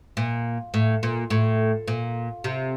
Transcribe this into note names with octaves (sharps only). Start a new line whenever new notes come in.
A#2
A2
A#2
A2
A#2
C3